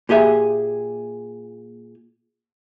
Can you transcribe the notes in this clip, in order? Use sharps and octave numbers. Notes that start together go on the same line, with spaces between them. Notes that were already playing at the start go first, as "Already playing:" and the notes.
A#2 G4 G#4 E5